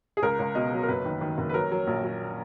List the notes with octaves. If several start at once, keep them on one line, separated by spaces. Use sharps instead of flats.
G#4
C#2 A#4
C#2
B2 D#5
F#3
A#4
F#1 B4
D#3
D#3
F#1
B4
F#3 A#4
F#3
A#1
F#3